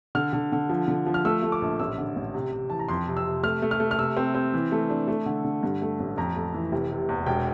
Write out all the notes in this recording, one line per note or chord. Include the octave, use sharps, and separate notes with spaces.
D3 F6
D3
D3
F3
D3
F3
F6
A3 E6
A3
D6
A#1
A1 E6
D3
A1
C3
C3
E3 A5
A#5
F2 C6
C3
E6
C3
A3 F6
A3
F6
A3
F6
C3 E6
C4
C4
E3
A3
D4
A3
D3
D3
G2
A3
A1
F2 A#5
A3
E3
F1
C3
E2
E1 G5